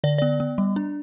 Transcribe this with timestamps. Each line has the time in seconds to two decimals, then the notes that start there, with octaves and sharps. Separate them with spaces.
0.04 D3 D5
0.18 B3 D5
0.40 B3
0.58 G3
0.76 D4